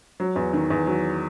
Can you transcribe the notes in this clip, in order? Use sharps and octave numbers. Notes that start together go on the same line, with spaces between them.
F#3
E2
D#3
E2
F#3